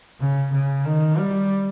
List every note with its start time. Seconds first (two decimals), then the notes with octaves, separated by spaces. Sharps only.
0.20 C#3
0.53 C#3
0.85 D#3
1.18 G3